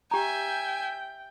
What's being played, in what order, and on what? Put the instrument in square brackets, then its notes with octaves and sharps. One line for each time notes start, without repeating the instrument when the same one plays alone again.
[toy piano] G4 A#5 [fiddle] E5 G#5 [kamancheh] G5